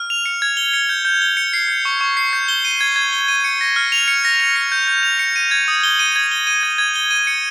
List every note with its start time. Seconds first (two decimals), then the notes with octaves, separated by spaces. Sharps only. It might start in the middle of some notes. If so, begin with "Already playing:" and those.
Already playing: F6
0.10 F7
0.26 C#7
0.42 G#6
0.57 G7
0.74 C#7
0.89 G6
1.05 G6
1.22 G7
1.37 C#7
1.53 C7
1.68 G6
1.85 C#6
2.01 C#6
2.17 C7
2.33 G6
2.48 G7
2.65 D#7
2.81 G#6
2.96 G#6
3.13 G7
3.28 D#7
3.44 C#7
3.61 A#6
3.76 F6
3.92 F7
4.08 C#7
4.25 A#6
4.40 F7
4.56 C#7
4.72 G6
4.88 G6
5.03 F7
5.19 C#7
5.36 D#7
5.51 G#6
5.68 D#6
5.83 G7
5.99 D#7
6.16 G#6
6.31 G7
6.47 D#7
6.63 G#6
6.78 G#6
6.96 G7
7.11 D#7
7.27 C#7